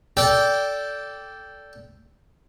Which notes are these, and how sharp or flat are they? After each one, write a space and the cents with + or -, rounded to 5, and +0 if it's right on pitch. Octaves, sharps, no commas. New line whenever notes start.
A4 +0 D5 -15 G5 +0